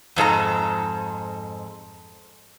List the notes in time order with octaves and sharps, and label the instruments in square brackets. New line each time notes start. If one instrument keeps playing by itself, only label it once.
[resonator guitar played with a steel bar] F2 G#2 A4 A#5